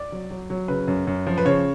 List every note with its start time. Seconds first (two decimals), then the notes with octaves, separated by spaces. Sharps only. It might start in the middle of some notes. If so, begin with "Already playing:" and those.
Already playing: D5
0.12 F#3
0.30 F#3
0.50 F#3
0.68 C#3 B4
0.88 F#2
1.07 F#2
1.27 F3
1.38 B4
1.45 C#3 C#5